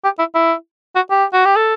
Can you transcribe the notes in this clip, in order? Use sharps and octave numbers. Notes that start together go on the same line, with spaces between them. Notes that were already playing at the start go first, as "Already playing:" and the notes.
G4
E4
E4
F#4
G4
F#4
G4
A4